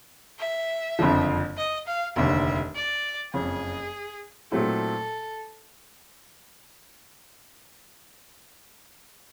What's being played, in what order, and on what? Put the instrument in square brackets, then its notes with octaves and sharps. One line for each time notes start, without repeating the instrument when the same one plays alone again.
[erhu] E5
[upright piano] F#1 F2 D3 F3
[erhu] D#5
F5
[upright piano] F1 D#2 D3 [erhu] E5
[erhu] D5
[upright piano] F#1 F2 C#3 [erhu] G#4
[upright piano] A#2 F#3 A3 C4 E4 [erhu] A4